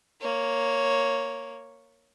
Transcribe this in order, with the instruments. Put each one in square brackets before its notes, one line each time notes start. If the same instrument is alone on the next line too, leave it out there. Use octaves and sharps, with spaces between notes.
[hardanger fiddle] A#3 C#5